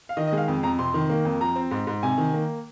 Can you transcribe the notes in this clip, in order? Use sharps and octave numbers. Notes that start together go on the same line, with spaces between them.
F5
D#3 D#5
D#5
G#3
F5
F2
F2 A#5
C3 C6
D#3
A#3
F2
F3 A#5
C4
G#2
G#2
C3 G#5
D#3
A#3